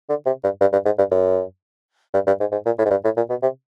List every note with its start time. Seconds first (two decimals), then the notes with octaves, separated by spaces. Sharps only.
0.09 D3
0.26 C3
0.44 G2
0.60 G2
0.72 G2
0.85 G#2
0.98 G2
1.11 F#2
2.14 G2
2.27 G2
2.40 G#2
2.52 G#2
2.66 A#2
2.78 A2
2.85 G#2
2.90 G2
3.04 A2
3.16 A#2
3.30 B2
3.42 C3